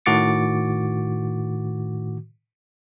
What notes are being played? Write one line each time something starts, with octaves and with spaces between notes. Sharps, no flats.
A2 D#3 F#4 D6 A6 C#7